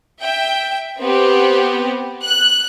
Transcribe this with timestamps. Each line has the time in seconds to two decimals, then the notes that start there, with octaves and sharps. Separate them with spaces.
0.21 E5 G5
0.99 B3 C4 G4
2.23 F#6